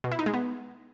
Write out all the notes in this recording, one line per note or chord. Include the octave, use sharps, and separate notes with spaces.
B2
E4
D#4
G#3
B3